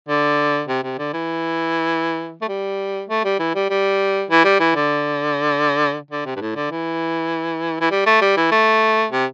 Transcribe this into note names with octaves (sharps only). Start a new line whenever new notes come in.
D3
C3
C3
D3
E3
A3
G3
A3
G3
E3
G3
G3
E3
G3
E3
D3
D3
C3
G2
A2
D3
E3
E3
G3
A3
G3
E3
A3
C3